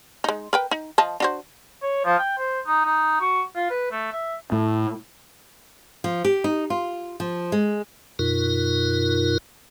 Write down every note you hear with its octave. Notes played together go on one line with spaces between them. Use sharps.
G#3 D#4
A#4 B4 G5
D#4
F3 D#5 A5
D4 F#4 C5
C#5
F3
G5
C5
D#4
D#4
F#4
F4
B4
A3
E5
A2
F3
G4
D#4
F4
F3
G#3
F#2 B2 D#4 F4 A#4